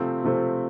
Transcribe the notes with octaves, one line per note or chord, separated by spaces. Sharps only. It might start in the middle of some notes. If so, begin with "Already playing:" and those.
Already playing: C3 F3 A3 C4
C3 F3 A3 C4